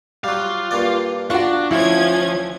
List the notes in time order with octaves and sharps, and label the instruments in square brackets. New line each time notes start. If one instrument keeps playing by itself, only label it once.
[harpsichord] F#3 G3 [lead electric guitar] F4 F5
[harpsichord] G2 A#3 D5
[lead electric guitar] D4 [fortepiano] F4 F#4 [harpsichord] A#5 C#6
[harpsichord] D2 [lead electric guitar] F3 [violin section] C#4 G#6 [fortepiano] E4